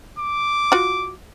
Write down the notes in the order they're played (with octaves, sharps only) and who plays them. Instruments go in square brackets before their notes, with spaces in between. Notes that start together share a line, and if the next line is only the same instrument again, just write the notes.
[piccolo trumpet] D6
[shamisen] F4 F#4